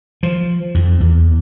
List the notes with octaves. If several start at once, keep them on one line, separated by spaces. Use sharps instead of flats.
F3
F2
E2